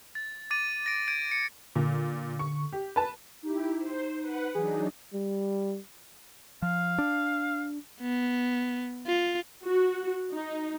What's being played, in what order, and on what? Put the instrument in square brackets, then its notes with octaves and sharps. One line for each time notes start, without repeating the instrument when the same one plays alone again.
[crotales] A6
D6 A6 D#7
A#6 D7
G#6 D7 D#7
C#7
[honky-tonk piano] A#2 [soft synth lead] D3
[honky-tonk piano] C#6
G4
B4 A5
[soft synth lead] D#4 [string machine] E4 G4
[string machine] C5
B4 F#5
[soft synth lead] E3 [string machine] F#3 D4 D#4 [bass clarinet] G#4
[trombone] G3
[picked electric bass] F3 [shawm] F5
[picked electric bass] D4
[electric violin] B3
F4
[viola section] F#4
D#4